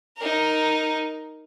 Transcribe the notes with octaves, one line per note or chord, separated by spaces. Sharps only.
D#4 A#4